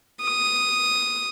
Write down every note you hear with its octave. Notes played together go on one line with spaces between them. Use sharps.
D#6